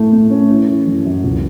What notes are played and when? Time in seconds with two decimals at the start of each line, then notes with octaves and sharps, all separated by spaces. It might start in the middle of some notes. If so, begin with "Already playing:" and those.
Already playing: A2 A3
0.13 A2
0.30 C#4
0.49 E3
0.69 E3
0.87 F#2
1.06 F#2
1.24 C#2